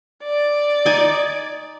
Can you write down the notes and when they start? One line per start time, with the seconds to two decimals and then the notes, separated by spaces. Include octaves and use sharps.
0.23 D5
0.86 D#4 G#5